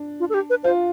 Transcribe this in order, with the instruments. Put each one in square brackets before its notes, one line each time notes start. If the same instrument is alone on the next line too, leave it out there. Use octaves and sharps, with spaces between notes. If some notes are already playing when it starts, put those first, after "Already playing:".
Already playing: [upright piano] D4
[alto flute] F4
A4
G4
B4
[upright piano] F4 [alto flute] C5